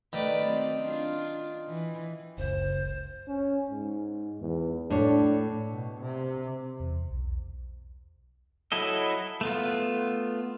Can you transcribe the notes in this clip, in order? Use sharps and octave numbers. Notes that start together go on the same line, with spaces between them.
D#3 A3 B4 D5
F#3 C4
D4 F4
E3
F#1 C#2 C5
C#4
G#2
E2
A2 D4 C#5
B2
C3
E2
B1
F#3 E4 A4 D#5
A3 B3 F4